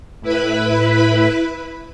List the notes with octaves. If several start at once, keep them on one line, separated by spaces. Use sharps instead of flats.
A2 E4 B4 B5